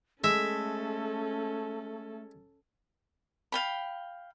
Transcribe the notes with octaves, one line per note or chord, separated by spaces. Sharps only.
G#3 A3 C#4 A4 E5
F5 G5 B5